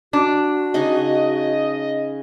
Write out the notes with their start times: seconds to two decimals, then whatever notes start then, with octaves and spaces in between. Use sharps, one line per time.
0.13 D4 F#4
0.74 C#3 D#4 D#5